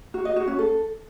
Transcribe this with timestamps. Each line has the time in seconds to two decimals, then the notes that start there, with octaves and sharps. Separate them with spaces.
0.14 F#4
0.25 D#5
0.36 F#4
0.47 C#4
0.59 A4